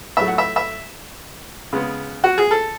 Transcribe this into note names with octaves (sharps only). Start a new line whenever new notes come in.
A2 F#3 A3 E5
F#5
E5
E5
C#3 G#3 B3
F#4
G#4
A4